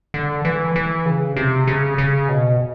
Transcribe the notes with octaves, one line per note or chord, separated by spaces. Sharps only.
D3
E3
E3
C#3
C3
C#3
C#3
B2